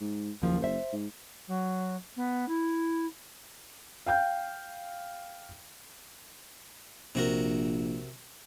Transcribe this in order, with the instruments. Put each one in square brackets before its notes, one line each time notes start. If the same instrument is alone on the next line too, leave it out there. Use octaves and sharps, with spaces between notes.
[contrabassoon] G#2
[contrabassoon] F#1 [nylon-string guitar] D#2 F3
[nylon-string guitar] C5 E5
[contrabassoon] G#2
[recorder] F#3
B3
E4
[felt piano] F5 G5 G6
[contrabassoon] A#1 [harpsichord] C3 F#4 A#4